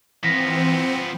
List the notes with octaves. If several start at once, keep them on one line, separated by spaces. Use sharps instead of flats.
E3 F3 B3 C4 A#6 B6